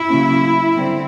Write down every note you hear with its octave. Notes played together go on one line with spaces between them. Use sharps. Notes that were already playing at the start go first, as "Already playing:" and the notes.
Already playing: E4
C#3 F#3 A#3 C#4
D3 G3 C4